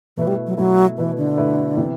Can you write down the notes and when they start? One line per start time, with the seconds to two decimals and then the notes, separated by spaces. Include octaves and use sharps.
0.17 B2 E3 A3 E4 B4
0.27 G3
0.47 F#3
0.57 B2 F#3 A3 E4 B4
0.98 B2 E3 A3 E4 B4
1.17 D3
1.37 B2 A3 E4 B4
1.77 C3 E3 B3